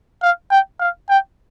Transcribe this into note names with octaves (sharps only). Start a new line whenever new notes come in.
F5
G5
F5
G5